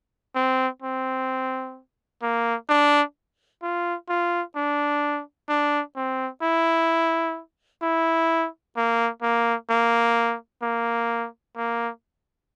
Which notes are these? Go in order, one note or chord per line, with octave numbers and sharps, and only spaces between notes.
C4
C4
A#3
D4
F4
F4
D4
D4
C4
E4
E4
A#3
A#3
A#3
A#3
A#3